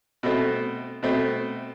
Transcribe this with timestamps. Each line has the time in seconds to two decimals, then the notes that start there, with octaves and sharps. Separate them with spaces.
0.23 B2 A3 C4
1.03 B2 A3 C4